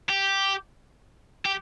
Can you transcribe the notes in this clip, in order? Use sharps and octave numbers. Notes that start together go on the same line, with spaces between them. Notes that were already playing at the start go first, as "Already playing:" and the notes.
G4
G4